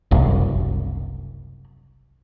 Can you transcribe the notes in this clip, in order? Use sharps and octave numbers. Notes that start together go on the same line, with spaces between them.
F#1 C2